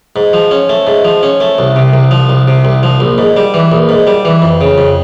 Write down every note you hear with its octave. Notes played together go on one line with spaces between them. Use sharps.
G#2
F3
C#4
A3
G#2
F3
C#4
A3
C2
C3
C2
F3
C2
C3
C2
F3
A#1
G#2
G3
E3
A#1
G#2
G3
E3
F2
C#3
F2